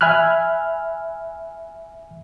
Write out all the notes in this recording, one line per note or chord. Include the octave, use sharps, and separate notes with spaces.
E5 G#5 B5 F6 F#6